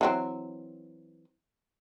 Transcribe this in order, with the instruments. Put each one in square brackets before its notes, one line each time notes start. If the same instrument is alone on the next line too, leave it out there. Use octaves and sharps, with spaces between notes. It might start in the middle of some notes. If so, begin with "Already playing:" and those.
[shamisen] E3 F#3 C4